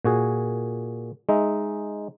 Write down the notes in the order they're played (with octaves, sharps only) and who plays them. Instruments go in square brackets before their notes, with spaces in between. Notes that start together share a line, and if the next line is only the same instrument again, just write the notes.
[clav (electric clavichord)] A#2 F#4 G#4
G#3 D#4 E5